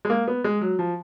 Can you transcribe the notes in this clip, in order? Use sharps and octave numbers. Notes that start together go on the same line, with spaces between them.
G#3
A#3
B3
G#3
F#3
F3